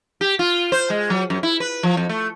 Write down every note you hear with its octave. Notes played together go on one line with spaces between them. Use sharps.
G4
F4
C5
G#3
F#3
F#2
E4
B4
F3
F2
A3